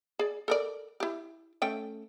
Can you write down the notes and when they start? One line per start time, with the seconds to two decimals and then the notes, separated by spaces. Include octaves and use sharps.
0.19 G#4 D5
0.48 A4 A#4 D5
1.00 E4 G4
1.62 A3 C#4 G5